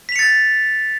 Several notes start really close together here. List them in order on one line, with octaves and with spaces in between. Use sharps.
B6 F7 C#7 A6